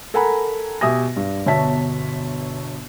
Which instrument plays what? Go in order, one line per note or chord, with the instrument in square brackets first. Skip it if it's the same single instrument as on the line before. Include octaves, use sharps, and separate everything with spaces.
[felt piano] A4 A#4 F#5 G#5 A#5 B5
B2 G4 E5 G#5 D#6 A#6
G2
G1 B2 C#5 E5 A5 B6